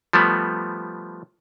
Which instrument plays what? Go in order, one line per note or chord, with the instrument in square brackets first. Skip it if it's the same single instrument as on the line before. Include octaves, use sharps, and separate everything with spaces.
[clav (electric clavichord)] F3 G3 A3 B3